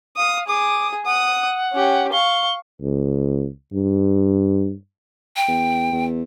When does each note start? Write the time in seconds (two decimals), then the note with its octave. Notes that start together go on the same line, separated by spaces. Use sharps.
0.17 F5 D#6
0.47 G#4 D6 D#6
1.06 F#5 D#6
1.72 C#4 G4
2.12 F5 C#6 G7
2.81 C#2
3.73 G2
5.36 G5
5.48 E2
5.92 E2